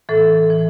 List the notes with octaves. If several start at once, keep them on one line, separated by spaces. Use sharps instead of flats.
A2 E3 A4
E3